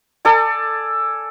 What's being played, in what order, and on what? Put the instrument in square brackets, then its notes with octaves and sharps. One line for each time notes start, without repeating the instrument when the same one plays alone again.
[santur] A4 D5 G#5